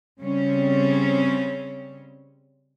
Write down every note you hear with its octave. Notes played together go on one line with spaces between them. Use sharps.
C#3 G3 C4 C#4